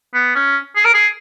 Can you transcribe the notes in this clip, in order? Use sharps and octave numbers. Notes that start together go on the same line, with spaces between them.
B3
C#4
G#4
A#4
G#4